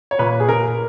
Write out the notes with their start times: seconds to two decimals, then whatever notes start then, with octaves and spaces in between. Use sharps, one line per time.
0.11 C#5
0.19 A#2 B4
0.40 G#4
0.49 A#2 A#4